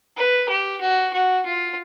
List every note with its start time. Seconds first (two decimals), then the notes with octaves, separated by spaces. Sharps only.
0.17 B4
0.49 G4
0.81 F#4
1.13 F#4
1.45 F4